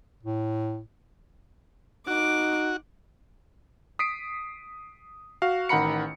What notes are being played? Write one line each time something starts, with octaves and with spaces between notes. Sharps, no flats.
A2
D#4 F#4 D6
D#6 B6 C7 D7
F#4 F5
A1 D#3 F#5 A#5 B5 C#7